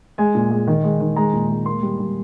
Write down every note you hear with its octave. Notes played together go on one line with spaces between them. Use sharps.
G#3 G#5
A#2
G#3
D#3
G#3
D#3
G#3 A#5
A#2
G#3
A#3 C6
G3
G3